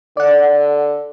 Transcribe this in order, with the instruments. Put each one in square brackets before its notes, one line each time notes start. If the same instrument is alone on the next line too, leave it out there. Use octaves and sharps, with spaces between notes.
[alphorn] D3 [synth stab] D5 F#5